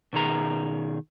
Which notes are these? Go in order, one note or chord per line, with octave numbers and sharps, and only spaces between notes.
B2 D#3 G#4 A#5